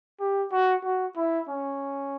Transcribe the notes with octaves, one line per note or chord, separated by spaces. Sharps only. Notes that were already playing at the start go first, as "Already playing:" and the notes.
G4
F#4
F#4
E4
C#4